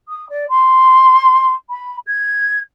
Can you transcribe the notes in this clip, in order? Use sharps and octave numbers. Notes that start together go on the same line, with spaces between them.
D#6
D5
C6
B5
G#6